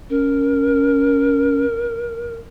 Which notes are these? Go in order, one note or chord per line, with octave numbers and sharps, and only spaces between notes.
C#4 A#4